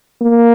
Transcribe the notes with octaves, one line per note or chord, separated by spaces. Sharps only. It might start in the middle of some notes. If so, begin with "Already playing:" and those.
A#3